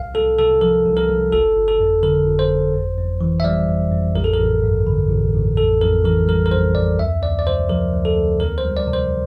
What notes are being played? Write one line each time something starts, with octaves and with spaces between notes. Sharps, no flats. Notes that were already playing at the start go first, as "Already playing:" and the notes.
Already playing: C2 F5
C2 A4
C3 A4
F3 A#4
C2
A#4
C2
G1 A4
G1
A4
F2
D3 A#4
G1
C5
G1
F2
F2
E3
E5
G3 D5
F2
F2
A1 A#4
A4
A#4
A1
G2
D3
A1
A1
F2 A4
F2 A#4
E3 A#4
G3 A#4
A#4
F2 C5
F2 D5
D2 E5
D2 D5
D5
C3 C5
F3 A#4
D2
A4
D2
E2 A#4
C5
G3
D5
C3
C5